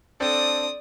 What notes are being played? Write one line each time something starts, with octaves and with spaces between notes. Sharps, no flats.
C4 D4 A4 D5 D#6